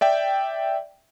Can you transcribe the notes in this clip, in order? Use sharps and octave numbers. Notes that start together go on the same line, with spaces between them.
D5 E5 G5